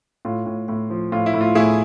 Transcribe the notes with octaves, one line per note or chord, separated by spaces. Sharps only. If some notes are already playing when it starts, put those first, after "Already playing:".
A2 F4
A2
A2
F3
A2 F4
E4
A2
F4
A2 E4 G#4